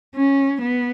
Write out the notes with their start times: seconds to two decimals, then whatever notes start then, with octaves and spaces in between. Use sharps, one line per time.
0.15 C#4
0.61 B3